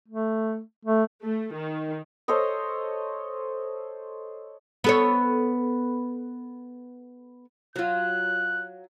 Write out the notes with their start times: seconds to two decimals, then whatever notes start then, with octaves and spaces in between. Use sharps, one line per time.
0.08 A3
0.85 A3
1.22 A3
1.53 D#3
2.28 A4 C5 C#5 D#5
4.84 B3 A4 C#5
7.76 F#3 F4 F#6